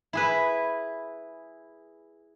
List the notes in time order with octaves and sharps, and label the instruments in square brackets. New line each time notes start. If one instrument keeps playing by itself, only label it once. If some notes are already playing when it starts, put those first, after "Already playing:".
[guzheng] E4 G#4 B4